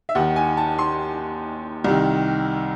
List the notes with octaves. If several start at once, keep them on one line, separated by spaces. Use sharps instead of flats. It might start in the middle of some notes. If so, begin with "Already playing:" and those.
E5
D#2 D#3 F#5
G#5
A5
C6
C2 C3 D#3